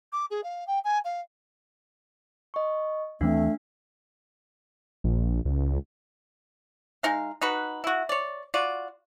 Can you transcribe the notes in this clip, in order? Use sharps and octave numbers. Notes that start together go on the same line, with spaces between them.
D6
G#4
F5
G5
G#5
F5
D#5 C#6
D#2 E3 A3 C4 D4 F5
A#1
C#2
G#3 D#4 F5
D#4 F#4 B4
E4 F#4
C#5 D5
F4 F#4 D5